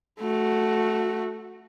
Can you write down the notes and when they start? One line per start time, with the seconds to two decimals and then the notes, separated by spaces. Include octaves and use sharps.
0.20 A3 F#4